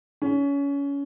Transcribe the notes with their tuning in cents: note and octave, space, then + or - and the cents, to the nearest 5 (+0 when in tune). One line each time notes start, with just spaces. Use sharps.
C#4 +25